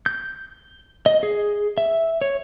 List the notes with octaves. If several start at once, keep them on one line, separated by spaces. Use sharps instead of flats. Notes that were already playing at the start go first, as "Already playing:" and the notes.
G6
D#5
G#4
E5
C#5